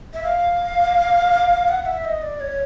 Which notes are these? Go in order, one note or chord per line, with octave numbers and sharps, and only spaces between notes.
E5
F5
F#5
E5
D#5
D5
C#5